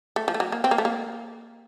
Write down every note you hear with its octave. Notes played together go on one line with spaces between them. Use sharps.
A3
F3
A3
F#3
A#3
C4
A#3
A3
A#3